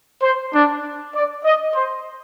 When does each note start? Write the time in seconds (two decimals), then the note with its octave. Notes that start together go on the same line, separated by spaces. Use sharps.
0.21 C5
0.53 D4
1.14 D5
1.44 D#5
1.74 C5